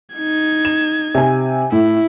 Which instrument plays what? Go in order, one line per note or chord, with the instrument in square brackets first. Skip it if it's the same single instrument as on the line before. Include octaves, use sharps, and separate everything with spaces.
[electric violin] D#4 G#6
[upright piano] E7
C3 G#5
[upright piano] A2 [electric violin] E4